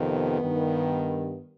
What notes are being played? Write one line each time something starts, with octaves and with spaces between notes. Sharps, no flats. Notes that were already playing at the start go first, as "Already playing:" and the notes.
Already playing: F2 C3 D#3 B3
G2 D#3